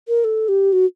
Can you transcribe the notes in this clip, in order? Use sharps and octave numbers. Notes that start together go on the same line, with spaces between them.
A#4
A4
G4
F#4